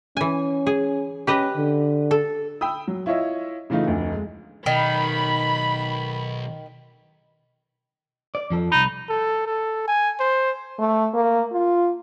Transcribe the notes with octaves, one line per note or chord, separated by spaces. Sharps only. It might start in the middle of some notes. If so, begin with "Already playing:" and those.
E3 C#4 G#5
G#4
C#4 G4 B4 D#5
D3
A4
G5 B5 D#6 E6
F#3
E4 F4 C#5 D#5 E5
C#3 E3 A3 D#4 F4
F1 D2
G#3
B1 D#3 B5
D5
F2 F3 A4
C2 D#4 B5
A4
A4
G#5
C5
A3
A#3
F4